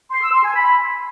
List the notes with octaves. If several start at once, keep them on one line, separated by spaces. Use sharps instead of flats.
C6
E6
C6
G#5
B5